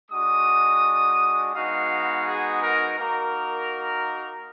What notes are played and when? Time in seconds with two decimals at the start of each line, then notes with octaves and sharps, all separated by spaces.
0.11 G#3 D4 F#4 D#6
1.54 G#3 B3 D#4 F#4 F5
2.26 G#4
2.62 A#4
2.97 A#3 D#4 F#4 A#4